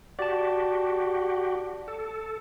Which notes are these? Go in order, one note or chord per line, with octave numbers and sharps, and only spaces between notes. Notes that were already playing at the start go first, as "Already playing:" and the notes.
F#4 G4 D5 A5
A4